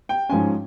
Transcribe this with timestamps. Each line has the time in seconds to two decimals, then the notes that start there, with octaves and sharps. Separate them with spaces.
0.09 G5
0.29 G#2 F3 G#3 C#4 G#5